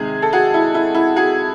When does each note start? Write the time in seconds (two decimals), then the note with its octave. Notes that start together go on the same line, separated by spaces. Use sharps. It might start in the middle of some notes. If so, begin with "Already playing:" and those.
Already playing: C3 D#3 G#3 G#4
0.22 A4
0.33 F#4 G#4
0.54 E4
0.75 E4
0.95 E4
1.16 F#4 G#4